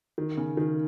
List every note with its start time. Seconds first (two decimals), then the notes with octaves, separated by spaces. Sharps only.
0.18 D#3
0.37 C#3
0.57 D#3